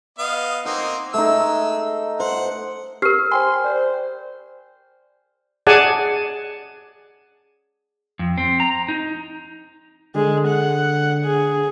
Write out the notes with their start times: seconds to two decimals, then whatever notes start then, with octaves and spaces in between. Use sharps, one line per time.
0.18 B3 D#5 F5
0.65 A#3 C4 D#4 F#5
1.14 G#3 A3 D#4 E6
2.20 C5 F#5
3.02 G4 A#4 F6
3.32 C5 G5 G#5 C6
3.65 C5 D5
5.67 G#4 D5 F#5 G#5 A5
8.19 F2
8.38 C4
8.60 A#5
8.88 D#4
10.15 D3 G#3
10.48 F#5
11.25 G#4